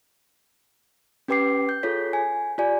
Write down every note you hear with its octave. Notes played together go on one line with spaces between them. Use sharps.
C#4 G4 B4 G5 D6 C7
G6
F4 G#4 A4 C#5 B6
G#5
F4 G4 D5 G#5